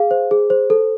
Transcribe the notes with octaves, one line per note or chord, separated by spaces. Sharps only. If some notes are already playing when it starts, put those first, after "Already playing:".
Already playing: G#4 F5
C5
G#4
C5
A4